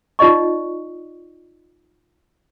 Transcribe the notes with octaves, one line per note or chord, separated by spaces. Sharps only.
D#4 F4 D5 D#5 C#6